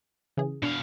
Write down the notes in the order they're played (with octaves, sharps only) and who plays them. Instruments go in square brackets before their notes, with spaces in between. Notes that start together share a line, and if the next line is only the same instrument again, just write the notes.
[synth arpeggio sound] C#3 E3 G#4
[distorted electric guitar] B2 F5 [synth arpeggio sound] D4